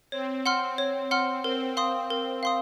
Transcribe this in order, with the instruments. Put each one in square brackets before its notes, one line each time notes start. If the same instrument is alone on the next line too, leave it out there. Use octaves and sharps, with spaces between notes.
[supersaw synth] C4 [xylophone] C#5
[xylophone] F#5 C6 F6
C#5
F#5 C6 F6
[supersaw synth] C4 [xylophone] A#4
[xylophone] F5 C6 D#6
[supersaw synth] C4 [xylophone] A#4
[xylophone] F5 C6 D#6